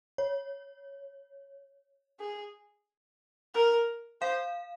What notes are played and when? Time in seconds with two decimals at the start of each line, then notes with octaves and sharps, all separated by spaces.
0.18 C#5
2.20 G#4
3.54 A#4
4.21 C5 F5